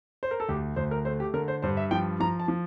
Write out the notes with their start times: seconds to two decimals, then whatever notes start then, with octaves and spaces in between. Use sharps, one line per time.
0.23 C5
0.31 A#4
0.40 A4
0.49 D2 G4
0.76 D2 C5
0.91 A#4
1.05 A3 C5
1.20 G4
1.34 D3 A#4
1.48 C5
1.62 G2 C5
1.77 E5
1.91 F3 G5
2.20 F3 A#5
2.40 A5
2.48 F3